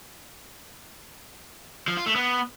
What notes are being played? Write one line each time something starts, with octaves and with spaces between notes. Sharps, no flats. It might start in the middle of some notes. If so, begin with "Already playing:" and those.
F3
F4
A3
B3